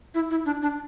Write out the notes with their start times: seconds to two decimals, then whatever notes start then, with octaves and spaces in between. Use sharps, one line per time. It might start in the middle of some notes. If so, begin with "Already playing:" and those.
0.15 E4
0.31 E4
0.46 D4
0.62 D4